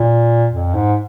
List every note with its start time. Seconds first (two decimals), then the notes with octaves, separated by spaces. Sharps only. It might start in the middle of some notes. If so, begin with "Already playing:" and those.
Already playing: A#2
0.52 F2
0.75 G#2